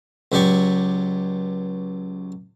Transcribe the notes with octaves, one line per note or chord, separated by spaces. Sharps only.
C#2 F#3 G4 D5 C#6